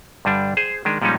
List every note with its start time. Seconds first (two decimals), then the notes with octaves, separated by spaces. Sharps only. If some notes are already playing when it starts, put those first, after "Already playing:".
0.25 G2 D3 G3 D4
0.57 G#4 C5
0.85 D#3 G#3 D4
1.02 A#2 F3 G3 G#3 C#4 D#4